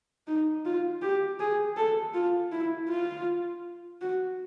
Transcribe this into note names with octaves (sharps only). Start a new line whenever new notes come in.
D#4
F4
G4
G#4
A4
F4
E4
F4
F#4